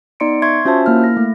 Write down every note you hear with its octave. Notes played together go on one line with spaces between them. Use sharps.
B3 D#4 D5 C6 C#7 D7
E5 C6 C#6 G#6
C#4 F4 F#4 C5 E5 A5
A#3 E4 F6
A#6
A3